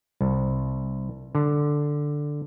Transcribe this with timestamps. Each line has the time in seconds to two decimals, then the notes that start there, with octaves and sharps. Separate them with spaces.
0.21 C2
1.35 D3